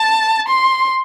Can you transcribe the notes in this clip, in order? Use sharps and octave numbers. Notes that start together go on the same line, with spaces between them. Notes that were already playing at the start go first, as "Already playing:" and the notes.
Already playing: A5
C6